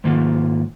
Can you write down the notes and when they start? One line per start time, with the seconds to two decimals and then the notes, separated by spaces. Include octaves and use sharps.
0.04 G#2 D#3 A#3 F4